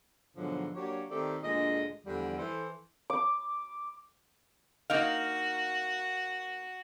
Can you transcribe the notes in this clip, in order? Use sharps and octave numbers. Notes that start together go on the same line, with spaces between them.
G#2 B2 D3 F3 F#3
F#3 A#3 D4 G4 C#5
D#3 A3 C4 G4 A4 D5
D2 A#2 D3 G#3 D#5
E2 D3 F3 G3
E3 A4 C5
D6
A#3 D#4 F#4 F5